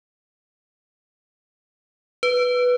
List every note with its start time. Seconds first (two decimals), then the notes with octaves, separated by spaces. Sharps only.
2.23 B4